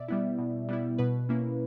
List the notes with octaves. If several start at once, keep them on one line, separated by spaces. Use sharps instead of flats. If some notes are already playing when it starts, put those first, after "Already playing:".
Already playing: B2 D5 E5
G3 B3 E4
B2
G3 B3 E4
B2 B4
A#3 C#4 E4